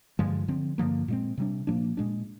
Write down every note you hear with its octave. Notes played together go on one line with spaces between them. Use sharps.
G2 D3 F3 G#3
D3 F3 C4
G2 D3 F3 A#3
A#2 G#3 C4
C3 G3 D4
A#2 F3 A#3 D4
A#2 G#3 D4